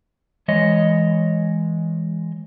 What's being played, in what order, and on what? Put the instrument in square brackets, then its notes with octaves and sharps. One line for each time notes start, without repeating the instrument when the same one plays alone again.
[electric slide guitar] E3 G#3 C#5 D#5